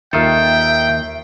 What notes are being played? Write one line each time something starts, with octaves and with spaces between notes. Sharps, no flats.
D#2 D#3 F4 A4 E5 G5